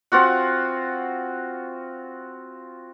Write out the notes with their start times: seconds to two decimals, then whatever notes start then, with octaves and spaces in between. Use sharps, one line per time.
0.12 C4 F4 F#4 F#5